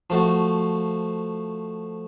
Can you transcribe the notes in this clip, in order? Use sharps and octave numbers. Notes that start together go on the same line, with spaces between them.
F3 A3 F#4